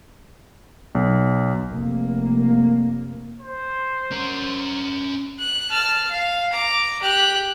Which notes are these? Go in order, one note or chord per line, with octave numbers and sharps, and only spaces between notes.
B1
F1 A#3
C5
C#4 A#4
F#6
A5 F6
F5
A#5 D6
G4 F#6